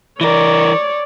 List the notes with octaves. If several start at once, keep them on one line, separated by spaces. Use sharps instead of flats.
E3 A#4 C#5 D5